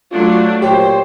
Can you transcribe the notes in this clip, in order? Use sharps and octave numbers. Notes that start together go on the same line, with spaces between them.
F#3 A3 D4 F4
A#2 G4 C5 C#5